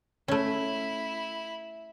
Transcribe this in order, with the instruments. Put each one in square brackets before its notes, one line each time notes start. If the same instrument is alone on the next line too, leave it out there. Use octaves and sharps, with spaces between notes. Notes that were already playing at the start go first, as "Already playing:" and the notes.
[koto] A3 C#4 [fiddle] E4 B5